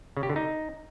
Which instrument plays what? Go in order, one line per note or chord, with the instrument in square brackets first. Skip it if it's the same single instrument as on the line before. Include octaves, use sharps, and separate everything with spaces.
[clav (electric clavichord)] C#3
G4
D3
D#4